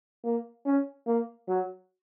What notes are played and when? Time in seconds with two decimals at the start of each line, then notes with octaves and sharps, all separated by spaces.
0.24 A#3
0.65 C#4
1.06 A#3
1.48 F#3